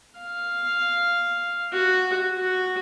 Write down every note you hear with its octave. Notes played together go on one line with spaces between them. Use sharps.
F5
F#4
F#4